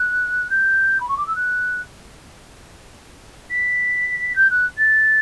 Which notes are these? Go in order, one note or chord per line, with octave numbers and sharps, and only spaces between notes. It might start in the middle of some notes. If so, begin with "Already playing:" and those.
Already playing: F#6
G6
B5
C#6
D6
E6
F#6
B6
G6
F#6
A6